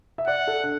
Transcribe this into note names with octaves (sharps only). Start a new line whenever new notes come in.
E5
D5 F#5
A4
D4